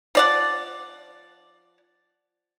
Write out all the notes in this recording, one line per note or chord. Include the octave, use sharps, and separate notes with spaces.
F3 D5 F#5